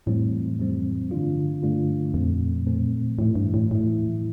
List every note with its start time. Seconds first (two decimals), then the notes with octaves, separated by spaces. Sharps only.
0.06 F2 A2 E3 G3 C4
0.59 F2 E3 G3 C4
1.11 G2 D3 A3 D4 F4
1.63 G2 D3 A3 D4 F4
2.14 F2 A#2 A3 C4
2.66 A#2 A3 C4
3.19 E2 A2 E3 A3 E4
3.35 G2
3.54 A2
3.71 E2 A2 E3 A3 E4